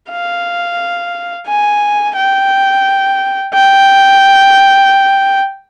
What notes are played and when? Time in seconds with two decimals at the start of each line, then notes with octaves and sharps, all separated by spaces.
0.11 F5
1.48 G#5
2.16 G5
3.54 G5